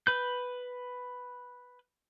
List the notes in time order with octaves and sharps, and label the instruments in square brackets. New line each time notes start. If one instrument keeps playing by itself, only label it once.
[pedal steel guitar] B4 G6